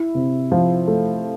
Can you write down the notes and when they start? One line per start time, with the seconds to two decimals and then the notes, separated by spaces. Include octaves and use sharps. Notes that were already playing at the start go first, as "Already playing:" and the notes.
Already playing: E4
0.15 C3
0.52 F3
0.87 A3